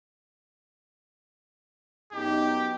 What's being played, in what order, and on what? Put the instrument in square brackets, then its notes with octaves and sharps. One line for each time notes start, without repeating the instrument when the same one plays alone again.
[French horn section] F#2 B3 D#4 [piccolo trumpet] G4